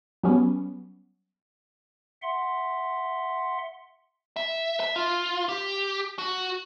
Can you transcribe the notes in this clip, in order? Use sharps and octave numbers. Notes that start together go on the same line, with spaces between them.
F#3 G3 B3 C#4
E5 F#5 C6
E5
E5
F4
G4
F#4